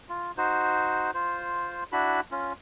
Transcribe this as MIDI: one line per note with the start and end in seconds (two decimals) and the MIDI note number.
0.09 0.32 65
0.37 1.11 63
0.37 1.11 66
0.37 1.11 72
1.14 1.84 65
1.14 1.84 72
1.92 2.21 62
1.92 2.21 64
1.92 2.21 66
1.92 2.21 83
2.32 2.53 61
2.32 2.53 65